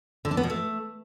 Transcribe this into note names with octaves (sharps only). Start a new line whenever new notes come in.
D3
D4
B3
B2
A3